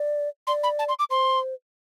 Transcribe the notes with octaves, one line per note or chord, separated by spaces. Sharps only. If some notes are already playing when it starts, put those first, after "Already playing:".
Already playing: D5
D5 C6
B5
A5
C6
D6
C5 C6